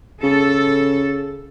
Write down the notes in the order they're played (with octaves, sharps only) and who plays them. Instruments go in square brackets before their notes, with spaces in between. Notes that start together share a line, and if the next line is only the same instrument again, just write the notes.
[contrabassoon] C#3 [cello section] A4